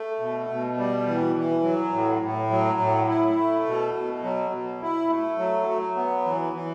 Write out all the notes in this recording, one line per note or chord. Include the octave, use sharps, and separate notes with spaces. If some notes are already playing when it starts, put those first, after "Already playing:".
Already playing: A3
B2
B2
G3
E3
E3
F#3
A2
A2
F#3
A2
E4
A3
B2
B2
F#3
B2
E4
A3
F#3
F#3
B3
E3
E3